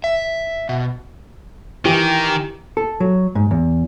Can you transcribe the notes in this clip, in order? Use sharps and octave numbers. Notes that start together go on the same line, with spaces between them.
E5
B2
D#3 E3 G4
A4
F#3
G#2
E2